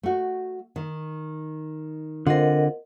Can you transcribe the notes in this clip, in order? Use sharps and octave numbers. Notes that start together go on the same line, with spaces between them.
A3 F#4
D#3
D3 C4 F4 A#4 D#5 F#5